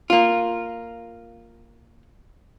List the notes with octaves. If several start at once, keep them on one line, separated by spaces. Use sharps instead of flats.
A#3 F4